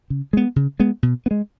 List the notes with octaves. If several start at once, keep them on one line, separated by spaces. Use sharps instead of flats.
C#3
G#3 B3
C#3
G#3 B3
B2
B3
G#3